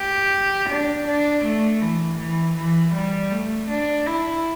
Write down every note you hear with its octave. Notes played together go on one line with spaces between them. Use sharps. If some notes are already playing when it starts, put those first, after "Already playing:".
Already playing: G4
D4
D4
A3
E3
E3
E3
G3
A3
D4
E4